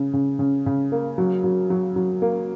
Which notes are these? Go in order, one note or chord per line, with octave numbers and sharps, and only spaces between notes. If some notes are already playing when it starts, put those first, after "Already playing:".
Already playing: C#3
C#3
C#3
C#3
A#3
F#3
F#3
F#3
F#3
A#3